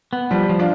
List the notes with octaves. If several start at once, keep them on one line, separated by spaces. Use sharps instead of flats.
B3
F3 G3
F3
D4 F4